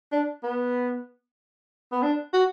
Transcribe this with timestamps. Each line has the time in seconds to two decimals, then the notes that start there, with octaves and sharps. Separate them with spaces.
0.12 D4
0.43 B3
1.92 B3
2.03 D4
2.33 F#4